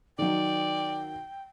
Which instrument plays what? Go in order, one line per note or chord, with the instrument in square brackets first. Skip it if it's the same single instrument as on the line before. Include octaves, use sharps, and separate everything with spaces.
[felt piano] D#3 F#3 [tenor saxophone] D5 [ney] G5